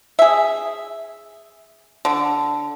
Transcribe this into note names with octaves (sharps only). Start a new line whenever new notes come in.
G#4 E5
D3